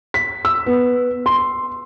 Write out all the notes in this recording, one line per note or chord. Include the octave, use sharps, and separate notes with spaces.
B6
E6
B3
C6